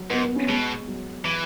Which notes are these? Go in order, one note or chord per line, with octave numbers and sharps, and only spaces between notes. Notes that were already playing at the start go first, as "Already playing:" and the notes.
Already playing: F#3
G#2 B3
B3
C#4
B2 G#3
F#3
E3